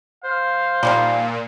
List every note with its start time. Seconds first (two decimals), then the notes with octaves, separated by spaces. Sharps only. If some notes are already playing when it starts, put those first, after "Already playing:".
0.24 C5 F5
0.83 A#2 D#3 F3 G3